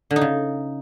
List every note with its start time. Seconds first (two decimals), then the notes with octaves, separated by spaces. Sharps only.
0.11 D3
0.16 D#4
0.21 C#3